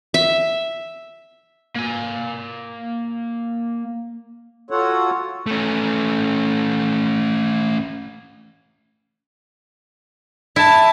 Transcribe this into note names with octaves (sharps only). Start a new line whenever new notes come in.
E5
A#3 G#5
F4 F#4 A4 C#5 F#5
A3 C#4
E4 A5